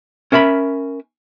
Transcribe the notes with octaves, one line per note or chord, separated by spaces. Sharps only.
C#4 A#4 E5 A#5 B5